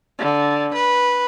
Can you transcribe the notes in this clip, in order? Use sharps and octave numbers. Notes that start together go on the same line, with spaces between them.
D3
B4